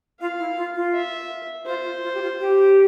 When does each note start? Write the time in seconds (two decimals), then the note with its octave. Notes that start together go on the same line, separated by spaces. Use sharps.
0.20 F4 F5
0.38 E4
0.57 F4
0.74 F4
0.93 E5
1.66 F4 C5
1.84 F4
2.03 F4
2.14 G4
2.20 F4
2.39 G4